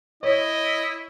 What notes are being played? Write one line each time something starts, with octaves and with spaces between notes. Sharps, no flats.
E4 C#5 D#5